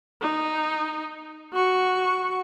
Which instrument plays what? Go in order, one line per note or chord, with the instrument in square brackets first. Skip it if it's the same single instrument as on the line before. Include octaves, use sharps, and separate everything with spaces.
[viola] D#4
F#4 C#6